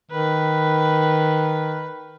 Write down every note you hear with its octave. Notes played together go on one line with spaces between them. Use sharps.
D#3 B4